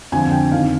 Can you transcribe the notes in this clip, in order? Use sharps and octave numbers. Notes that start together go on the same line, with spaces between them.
F2 D3 F3 G#5
G5
F2 D#3 F5